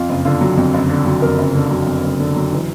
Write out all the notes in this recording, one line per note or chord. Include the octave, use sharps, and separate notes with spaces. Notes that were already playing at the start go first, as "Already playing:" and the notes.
Already playing: F2 F4
F#1
D3 F4
F#3
F2
F#1
D3
F#3
F2 A#4
F#1
D3
F#3
F2
F#1
D3
F#3
E3